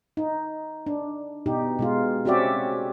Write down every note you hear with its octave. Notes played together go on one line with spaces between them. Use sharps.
D#4
D4
B2 D#4 G4
B2 G#3 F4
C4 C#4 F#4 G4 D5 E5